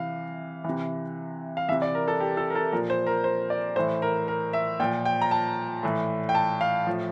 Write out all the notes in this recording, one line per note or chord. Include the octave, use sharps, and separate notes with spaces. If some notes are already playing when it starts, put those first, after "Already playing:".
Already playing: C3 E3 F5
C3 E3
F5
C3 E3 E5
D5
A#4
A4
G4
A4
A#4
A4
A#2 F3 A#4
C5
A#4
C5
D5
A2 E3 C5
A#4
A#4
E5
A#2 F3 G5
G5
A#5
A5
A2 E3
G5
A5
F5
A2 F3